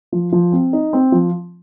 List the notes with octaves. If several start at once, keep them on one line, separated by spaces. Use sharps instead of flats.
F3
F3
C4
D#4
C4
F3